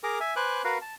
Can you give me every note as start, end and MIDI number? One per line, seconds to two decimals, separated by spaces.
0.03 0.19 68
0.03 0.19 70
0.03 0.19 82
0.03 0.19 86
0.20 0.34 76
0.20 0.34 80
0.36 0.62 71
0.36 0.62 72
0.36 0.62 80
0.36 0.62 86
0.36 0.62 90
0.64 0.78 66
0.64 0.78 70
0.64 0.78 71
0.64 0.78 77
0.81 0.95 81